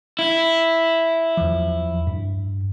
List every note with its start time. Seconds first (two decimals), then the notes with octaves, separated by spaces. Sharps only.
0.19 E4
1.37 E2 F3
2.07 G2